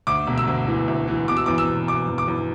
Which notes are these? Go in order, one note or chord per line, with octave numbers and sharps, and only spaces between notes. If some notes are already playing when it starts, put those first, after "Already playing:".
D2 D6
E1
E6
D2
E3
D2
E3
B2 D6
E6
E2 D6
E6
E1
E1 D6
E2
D6
E2